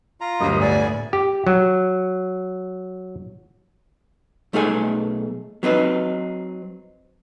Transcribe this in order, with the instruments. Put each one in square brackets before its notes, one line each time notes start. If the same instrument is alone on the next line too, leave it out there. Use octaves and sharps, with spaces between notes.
[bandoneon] F4 A#5
[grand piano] G1 D2 G3 [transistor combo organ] F#3 A#4 D#5 [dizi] D#6
[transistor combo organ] A2 [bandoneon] B3 E4 G#4 [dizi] D5
[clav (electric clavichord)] G4
F#3
[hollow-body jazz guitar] B1 A3 D#4 G#4 A4 G#5
F#3 C4 D#4 B4